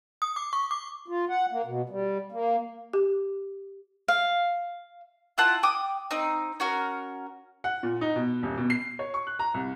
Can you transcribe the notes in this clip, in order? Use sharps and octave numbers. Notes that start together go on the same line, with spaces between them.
D#6
D6
C#6
D6
F4
F#5
A#3
B2
G3
A#3
G4
F5
E4 F4 F#5 A5
G5 D6 D#6
C4 D#4
C#4 F#4 A#4
F#5
A#2
D#4
B2
D#1
B2
C7
C#5
C#6
F#6
A#5
C2